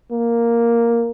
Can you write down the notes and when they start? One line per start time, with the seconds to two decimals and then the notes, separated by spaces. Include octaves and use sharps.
0.12 A#3